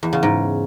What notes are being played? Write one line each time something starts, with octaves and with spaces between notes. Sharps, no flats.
E2
C#3
G#2